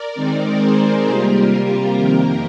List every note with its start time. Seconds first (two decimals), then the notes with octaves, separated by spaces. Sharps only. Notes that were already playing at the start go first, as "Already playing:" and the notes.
Already playing: A#4 D5
0.15 D#3 G#3 C4 D#4
0.61 G#4 C5
1.05 C3 G3 A#3 F4 G4 A#4
1.96 F2 C3 D#3 A#3 G4 A#4